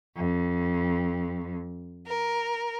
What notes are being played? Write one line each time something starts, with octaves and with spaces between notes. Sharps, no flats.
F2
A#4